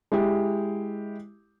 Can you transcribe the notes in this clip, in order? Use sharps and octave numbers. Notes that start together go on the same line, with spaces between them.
G#3 E4 G4